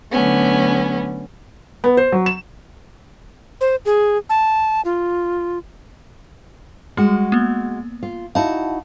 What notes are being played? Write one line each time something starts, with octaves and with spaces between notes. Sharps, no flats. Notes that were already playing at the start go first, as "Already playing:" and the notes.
D3 F#3 A3 B3 C#4
B3
C5
F#3
E7
C5
G#4
A5
F4
G3 G#3 F#4
A#3 B3
F4
D#4 E4 F#4 F5 A5